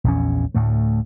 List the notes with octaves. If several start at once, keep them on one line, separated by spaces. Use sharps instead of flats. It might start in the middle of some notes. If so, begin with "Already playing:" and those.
A#1 E2 C#4
D2 A2 A3